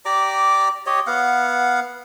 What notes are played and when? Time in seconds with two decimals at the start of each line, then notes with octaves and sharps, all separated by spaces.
0.05 G4 D5 A#5 D6
0.86 G4 C#5 D#5
1.07 B3 F5 F#5